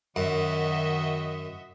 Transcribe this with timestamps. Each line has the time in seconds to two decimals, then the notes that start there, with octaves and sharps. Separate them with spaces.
0.16 F#2 D#3 F#4 D#5 E5